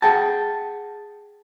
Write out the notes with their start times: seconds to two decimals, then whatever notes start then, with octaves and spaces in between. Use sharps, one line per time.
0.02 G#4 F#5 G5 A5